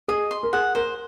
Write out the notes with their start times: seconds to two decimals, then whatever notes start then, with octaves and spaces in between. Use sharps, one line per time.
0.08 G#4 D#5
0.31 C6
0.43 A#4
0.53 G#4 F#5
0.75 A#4 C5